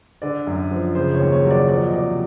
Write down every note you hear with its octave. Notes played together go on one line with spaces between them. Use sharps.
D3 D5
F#2
F3
C#3 C5
C#5
D#2
C#5
F#3
D5
F3 D5
D#5
C3 D5